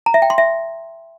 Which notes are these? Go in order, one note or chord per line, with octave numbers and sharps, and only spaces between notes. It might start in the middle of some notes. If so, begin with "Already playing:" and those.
A#5
E5
G5
C6
E5